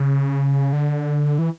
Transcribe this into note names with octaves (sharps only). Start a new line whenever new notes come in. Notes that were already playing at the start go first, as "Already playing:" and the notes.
Already playing: C#3
D3
E3